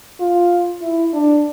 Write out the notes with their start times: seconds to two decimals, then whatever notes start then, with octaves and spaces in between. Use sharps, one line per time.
0.20 F4
0.82 E4
1.13 D4